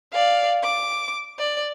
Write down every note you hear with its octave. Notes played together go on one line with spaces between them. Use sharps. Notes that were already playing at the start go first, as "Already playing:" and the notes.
D5 F5
D6
D5